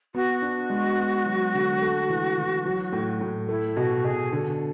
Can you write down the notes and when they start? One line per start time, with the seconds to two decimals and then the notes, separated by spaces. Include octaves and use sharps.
0.15 B3 F#4
0.42 D4
0.70 G#3
0.98 B3
1.26 F#3
1.54 D3
1.82 A3
2.09 E3
2.38 E3
2.66 F#3
2.93 A2
3.21 A2
3.49 A3 E4
3.77 B2 G#4
3.80 F#4
4.05 B2 G#4
4.32 D3